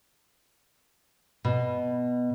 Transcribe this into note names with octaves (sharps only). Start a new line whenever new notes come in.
B2